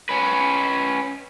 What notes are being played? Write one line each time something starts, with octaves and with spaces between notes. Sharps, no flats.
C#4 B4